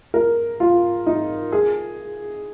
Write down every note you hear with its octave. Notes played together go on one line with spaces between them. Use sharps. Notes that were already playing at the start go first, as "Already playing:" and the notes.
A#4
F4
D#4
G#4